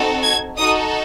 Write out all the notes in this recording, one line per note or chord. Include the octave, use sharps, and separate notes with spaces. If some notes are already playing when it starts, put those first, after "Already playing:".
Already playing: C4 D#4 F#4 A4
G#6
D#4 F#4 A4 D#6